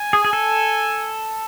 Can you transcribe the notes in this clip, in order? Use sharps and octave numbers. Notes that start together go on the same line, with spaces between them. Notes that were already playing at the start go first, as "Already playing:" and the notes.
Already playing: G#5
G#4
G#4
A4